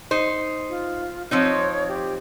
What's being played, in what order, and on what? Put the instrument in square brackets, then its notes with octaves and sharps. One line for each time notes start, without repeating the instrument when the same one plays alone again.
[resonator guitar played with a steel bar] D#4 C5
[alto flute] F4
[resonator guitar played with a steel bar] F3 C4 D#4 [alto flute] C#5
[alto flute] G4